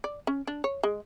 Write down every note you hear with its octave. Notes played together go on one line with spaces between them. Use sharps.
D5
C#4
D4
C#5
G#3